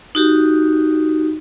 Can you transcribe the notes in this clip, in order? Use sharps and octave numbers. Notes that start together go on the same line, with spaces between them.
D#4 F#4 G4